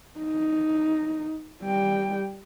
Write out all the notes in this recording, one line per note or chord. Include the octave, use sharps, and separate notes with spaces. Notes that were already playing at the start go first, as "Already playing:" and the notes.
D#4
G3 G5